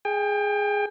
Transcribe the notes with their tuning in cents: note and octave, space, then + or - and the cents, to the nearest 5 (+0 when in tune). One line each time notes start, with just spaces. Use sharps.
G#4 +0 G5 +30